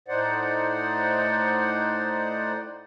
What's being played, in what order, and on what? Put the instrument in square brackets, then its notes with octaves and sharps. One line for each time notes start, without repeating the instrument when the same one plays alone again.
[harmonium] A2 D#4 C5 D5 F#5